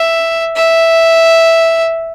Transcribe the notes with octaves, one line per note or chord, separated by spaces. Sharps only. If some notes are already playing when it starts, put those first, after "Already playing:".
Already playing: E5
E5